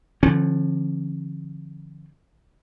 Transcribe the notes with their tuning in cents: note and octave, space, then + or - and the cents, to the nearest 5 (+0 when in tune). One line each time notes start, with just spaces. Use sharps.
D3 +0 F3 -35 C#4 -45